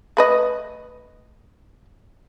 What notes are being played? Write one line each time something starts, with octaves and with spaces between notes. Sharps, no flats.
A3 B4 D#5